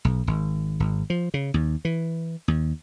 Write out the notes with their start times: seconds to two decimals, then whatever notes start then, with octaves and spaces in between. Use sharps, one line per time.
0.05 B1
0.27 G#1
0.80 G#1
1.10 F3
1.34 C#3
1.54 D#2
1.85 E3
2.48 D#2